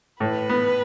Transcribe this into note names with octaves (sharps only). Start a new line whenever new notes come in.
A2 B4
B3